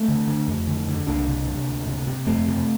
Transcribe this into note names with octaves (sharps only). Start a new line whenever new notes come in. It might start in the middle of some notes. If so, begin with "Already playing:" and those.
Already playing: A3 C4
D3
D3
F2
D3
D3
C2 A#3 D4
C3
C3
D2
C3
C3
F2 A3 C4
C3